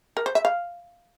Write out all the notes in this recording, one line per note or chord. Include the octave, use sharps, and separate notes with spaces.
A#4
C5
E5
F5